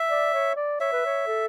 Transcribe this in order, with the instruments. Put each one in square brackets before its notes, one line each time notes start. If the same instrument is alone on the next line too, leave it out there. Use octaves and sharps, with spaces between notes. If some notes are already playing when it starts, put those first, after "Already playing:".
Already playing: [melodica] E5
[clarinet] D5
C#5
D5
[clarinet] C#5 [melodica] E5
[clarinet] B4
C#5
A4